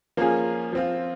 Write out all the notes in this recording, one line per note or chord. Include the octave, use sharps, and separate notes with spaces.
F3 A#3 C#4 F4 G#4
F3 C4 F4